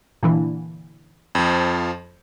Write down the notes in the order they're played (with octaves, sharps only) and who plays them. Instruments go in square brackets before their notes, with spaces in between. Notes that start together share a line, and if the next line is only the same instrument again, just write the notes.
[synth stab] A#2 D3 E3
[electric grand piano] F2 F3